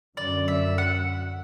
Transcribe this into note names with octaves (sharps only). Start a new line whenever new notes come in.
F#2 D3 F#3 D5
E5
F#5